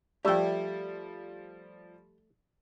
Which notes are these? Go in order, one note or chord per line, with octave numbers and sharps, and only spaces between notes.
F3 G3 A3 G4 D5 G5